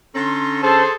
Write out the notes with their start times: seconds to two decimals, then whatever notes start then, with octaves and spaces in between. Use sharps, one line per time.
0.15 D3 C#4 A4 A#5 C6
0.63 G#4 A4 C5 A5